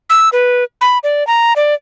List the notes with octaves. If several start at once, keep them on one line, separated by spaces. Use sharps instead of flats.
E6
B4
B5
D5
A#5
D5